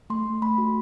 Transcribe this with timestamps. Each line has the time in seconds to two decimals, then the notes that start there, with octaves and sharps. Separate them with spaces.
0.10 A3 C6
0.26 A3
0.42 A3 B5
0.58 F#4